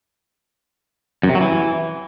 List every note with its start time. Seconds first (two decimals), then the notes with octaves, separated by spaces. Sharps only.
1.23 F#2
1.29 C3
1.35 F#3
1.41 E3